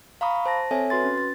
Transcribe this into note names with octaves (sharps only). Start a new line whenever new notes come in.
F5 A#5 B5 C#6 D#6
C5 A5 A#6
C4 A4 C#5 E5 G#5
F#4 B4 C6 A6
C#4
A6